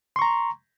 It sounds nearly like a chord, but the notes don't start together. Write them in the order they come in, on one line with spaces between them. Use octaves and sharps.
C6 C#6 A#5